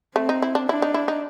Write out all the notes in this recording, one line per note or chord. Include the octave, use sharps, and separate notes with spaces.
A3 C4
D#4
E4
D4
D4 E4
D#4
E4
D#4